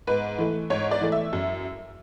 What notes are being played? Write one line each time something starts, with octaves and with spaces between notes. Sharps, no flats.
G#2 B4
E3 A3
G#2 C#5
D5
E3 A3
E5
F#2